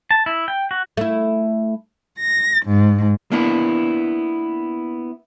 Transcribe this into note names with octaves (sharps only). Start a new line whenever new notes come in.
A5
E4
G5
F#4
A3 E4
A#6
G#2
A#3 B3 D4 E4